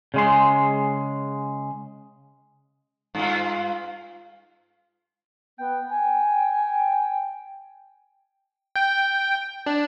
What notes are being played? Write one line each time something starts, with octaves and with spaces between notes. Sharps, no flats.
C#3 G#3 C6
G2 F4
B3 G5
G#5
G5
D4